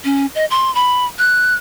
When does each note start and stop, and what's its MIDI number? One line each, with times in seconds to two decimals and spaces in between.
0.05 0.26 61
0.35 0.45 75
0.50 0.73 84
0.75 1.05 83
1.19 1.54 90